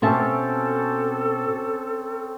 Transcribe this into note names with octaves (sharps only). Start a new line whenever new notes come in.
B2 C4 C#4 G4 A4 E5 A5